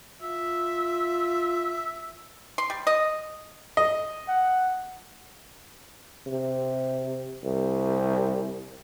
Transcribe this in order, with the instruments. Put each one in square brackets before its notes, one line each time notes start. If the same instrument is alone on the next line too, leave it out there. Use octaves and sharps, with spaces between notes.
[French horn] F4 [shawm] E5
[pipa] C6
G3
D#5
[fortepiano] D#5
[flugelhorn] F#5
[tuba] C3
C2